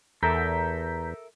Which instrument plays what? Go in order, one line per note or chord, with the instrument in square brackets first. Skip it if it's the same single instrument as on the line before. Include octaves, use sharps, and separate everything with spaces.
[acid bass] E2 [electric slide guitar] A4 A#4 E5 [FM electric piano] A#5 G6 B6